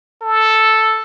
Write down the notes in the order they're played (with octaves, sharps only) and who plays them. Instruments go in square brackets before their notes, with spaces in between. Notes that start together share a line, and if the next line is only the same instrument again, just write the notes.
[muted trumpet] A4